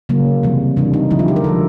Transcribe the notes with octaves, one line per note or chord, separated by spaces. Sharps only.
C#3 F#3 A#3
C3 E3 G3
C3 E3 G3 D4
D#4
D3 F3 G#3 E4
F4
G4
A#4
D3 F3 G#3 A4